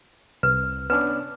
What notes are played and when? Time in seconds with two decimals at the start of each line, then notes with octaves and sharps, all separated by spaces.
0.43 C2 B4
0.90 B3 C#4 D4 B4